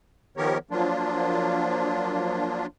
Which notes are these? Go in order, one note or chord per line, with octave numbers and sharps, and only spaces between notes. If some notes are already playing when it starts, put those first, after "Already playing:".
D#3 F3 B3 G4 A#4 C#5
F3 F#3 A#3 D4 F4